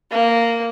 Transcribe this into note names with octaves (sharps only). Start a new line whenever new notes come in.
A#3